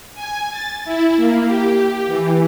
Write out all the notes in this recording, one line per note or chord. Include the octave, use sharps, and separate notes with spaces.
G#5
A6
E4
A#3
G4
E3